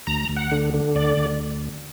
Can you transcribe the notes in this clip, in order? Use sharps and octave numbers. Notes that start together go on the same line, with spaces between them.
D2 A#5
D2
F#5
D3
D3
D2 D5
D2